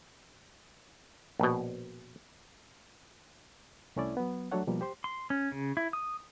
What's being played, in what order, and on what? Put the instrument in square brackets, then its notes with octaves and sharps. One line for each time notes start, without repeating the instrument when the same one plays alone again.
[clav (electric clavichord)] A#1 B2
[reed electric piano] C2 A3 C#4 E4 D5
F#3 B3
F#3 A3 D4 A4 C#5 F#5
B2 F3 G3 A#3
G4 C5 C6
[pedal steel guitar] C6
C#4
C#3
E4
D#6